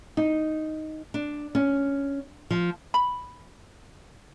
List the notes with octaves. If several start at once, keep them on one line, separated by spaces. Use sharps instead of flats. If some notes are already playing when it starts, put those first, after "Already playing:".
D#4
D4
C#4
F3
B5